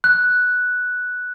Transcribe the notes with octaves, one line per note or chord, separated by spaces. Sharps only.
F#6